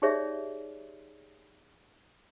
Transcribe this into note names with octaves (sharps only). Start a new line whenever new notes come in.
D#4 G4 G#4 C#5 D5 E5